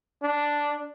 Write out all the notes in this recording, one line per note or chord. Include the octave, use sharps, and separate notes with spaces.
D4